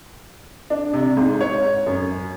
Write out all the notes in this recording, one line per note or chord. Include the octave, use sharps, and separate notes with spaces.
D4
C3
G#2
C#5
F#2